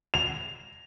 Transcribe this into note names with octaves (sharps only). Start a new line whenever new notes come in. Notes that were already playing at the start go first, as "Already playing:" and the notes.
F7